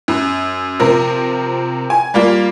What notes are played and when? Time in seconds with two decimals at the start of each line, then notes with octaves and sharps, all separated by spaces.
0.08 F#2
0.80 C3 F3 A#4
1.90 G#5
2.14 G3 A#3 F4